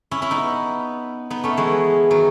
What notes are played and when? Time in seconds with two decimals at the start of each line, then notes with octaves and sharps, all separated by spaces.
0.11 C#4 E4
0.22 C#4 E4
0.31 B3 D#4
1.30 B3 D#4
1.44 A3 C#4
1.57 E3 G#3
2.10 D#3 F#3